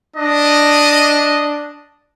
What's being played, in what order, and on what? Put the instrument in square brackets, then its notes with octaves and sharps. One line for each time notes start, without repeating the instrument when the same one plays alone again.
[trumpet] D4 [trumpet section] D#5